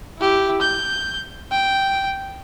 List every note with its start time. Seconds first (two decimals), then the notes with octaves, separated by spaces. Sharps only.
0.19 E4 G4
0.61 G6
1.52 G5